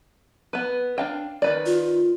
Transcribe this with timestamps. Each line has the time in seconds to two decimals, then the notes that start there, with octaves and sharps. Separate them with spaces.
0.53 B3 B4
0.98 D4 F5 G5
1.42 D#3 B4 D5
1.66 F4